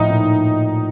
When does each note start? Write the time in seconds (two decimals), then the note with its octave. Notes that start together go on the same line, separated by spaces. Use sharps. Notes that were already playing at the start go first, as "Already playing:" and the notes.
Already playing: A2 F3 A3 D#4
0.10 A#2